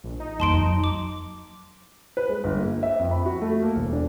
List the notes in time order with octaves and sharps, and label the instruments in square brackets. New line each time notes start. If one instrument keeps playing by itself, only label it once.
[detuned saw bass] A#1
D#4
[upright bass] F2 A#3 [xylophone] A5 C6 D7
[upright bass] F2 F#3
[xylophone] D6
[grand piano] B4
G#3
G1
A#3
E5
F2
B5
F#4
A3
A#3
E1
D4